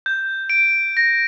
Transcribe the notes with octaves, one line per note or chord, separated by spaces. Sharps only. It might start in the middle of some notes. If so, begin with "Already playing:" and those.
G6
D7
A#6